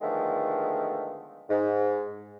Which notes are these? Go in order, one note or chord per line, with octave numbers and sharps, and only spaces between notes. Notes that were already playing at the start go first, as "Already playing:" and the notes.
D3 D#3 F3 G#3 A3 B3
G#2